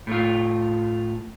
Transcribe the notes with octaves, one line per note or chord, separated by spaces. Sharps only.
A2 A3 F4